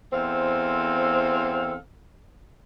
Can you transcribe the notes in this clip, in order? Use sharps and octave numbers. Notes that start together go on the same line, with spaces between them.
E2 C4 A4 C5 F5